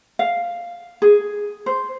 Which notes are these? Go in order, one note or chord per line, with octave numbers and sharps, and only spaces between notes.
F5
G#4
C5